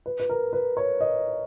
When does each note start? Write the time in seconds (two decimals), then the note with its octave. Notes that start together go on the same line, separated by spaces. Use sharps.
0.06 B4
0.20 B4
0.30 A#4
0.53 B4
0.77 C#5
1.01 D#5